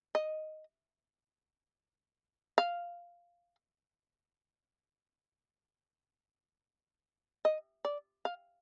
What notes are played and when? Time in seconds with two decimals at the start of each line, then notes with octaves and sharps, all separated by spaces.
0.15 D#5
2.58 F5
7.45 D#5
7.85 D5
8.25 F5